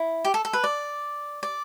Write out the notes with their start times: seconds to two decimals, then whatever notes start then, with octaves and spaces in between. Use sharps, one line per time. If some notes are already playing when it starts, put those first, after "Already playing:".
Already playing: E4
0.25 G4
0.34 A4
0.45 A4
0.53 B4
0.64 D5
1.43 D5